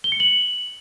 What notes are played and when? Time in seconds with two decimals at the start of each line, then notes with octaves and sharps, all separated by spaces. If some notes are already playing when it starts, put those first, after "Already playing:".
0.04 G7
0.12 C#7
0.20 F#7